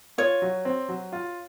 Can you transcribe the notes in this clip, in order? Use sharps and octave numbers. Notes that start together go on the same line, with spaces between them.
F4 C#5
F#3
C4
F#3
F4